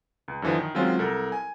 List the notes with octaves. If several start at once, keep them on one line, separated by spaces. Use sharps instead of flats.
C#2
F#2 D3 E3 F3
D#3
D#3 F#3 G#3 C4 C#4 F4
C2 A4 A#4
G#5